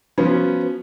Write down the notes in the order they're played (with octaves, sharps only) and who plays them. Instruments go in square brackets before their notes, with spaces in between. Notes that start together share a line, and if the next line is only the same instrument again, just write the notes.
[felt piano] F3 F#3 B3 C#4